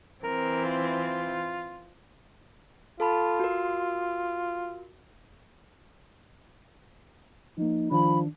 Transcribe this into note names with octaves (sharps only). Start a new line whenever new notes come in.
E3 C4 A#4
F4
F4 A4 A5 B5
F#4 A#4
F3 A#3 D#4
D#3 F3 D4 B5